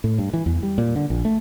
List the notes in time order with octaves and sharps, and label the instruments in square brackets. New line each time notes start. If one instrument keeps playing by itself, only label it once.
[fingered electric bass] A2
G2
E3
E2
G3
A#2
D3
A#1
A3